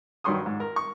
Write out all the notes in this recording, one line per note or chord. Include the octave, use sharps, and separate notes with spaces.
G2 D#3 F#3 C6 C#6 D#6
G#2
A#4
C#6